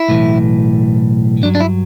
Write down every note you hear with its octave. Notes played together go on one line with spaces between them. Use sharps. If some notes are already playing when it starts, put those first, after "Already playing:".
Already playing: E4
B1 A2 E3
G2 F#3 D4
D4
E4